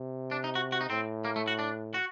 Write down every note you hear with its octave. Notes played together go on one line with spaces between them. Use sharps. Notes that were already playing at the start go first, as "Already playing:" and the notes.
Already playing: C3
D4
D#4
F#4
F#4
D#4
A2 C4
A#3
A3
F#4
D4
F#4